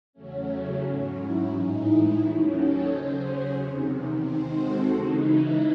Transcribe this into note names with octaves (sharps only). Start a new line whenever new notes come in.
E2 C#3 F#3 A3 C#4
G#2 F#3 C#4
E4
A2 E3 G#3 D#4
E4
D#2 D#3 F#3 C#4 E4
A4 C#5
C#3 F#3 C#4 C5 D#5
G#4 C5
E2 C3 D#3
D#2 D#3 G#3 C4 G#4 C5
F#4 A4
C#3 E3 G#3 D#4 F#4
E4